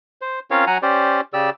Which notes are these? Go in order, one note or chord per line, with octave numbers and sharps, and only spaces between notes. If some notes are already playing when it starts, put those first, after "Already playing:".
C5
C4 C#4 F4 A#4 C#5 F5
F#3 F#5 G#5 A#5
C#4 G4 C5 D5
C#3 G4 D5 E6